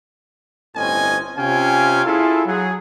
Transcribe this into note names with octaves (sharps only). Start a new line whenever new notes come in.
G1 A2 C4 C#4 D#5 G#5
C3 C#4 F4 F5 G5 G#5
E4 F4 G#4 A4
F#3 G#4